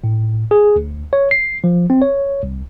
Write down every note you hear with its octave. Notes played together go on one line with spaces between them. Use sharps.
A2
G#4
D2
C#5
C7
F3
C4
C#5
C2